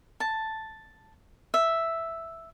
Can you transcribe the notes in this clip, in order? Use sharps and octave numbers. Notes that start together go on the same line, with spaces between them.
A5
E5